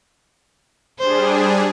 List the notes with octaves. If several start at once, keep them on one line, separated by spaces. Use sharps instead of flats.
G3 D4 G#4 C5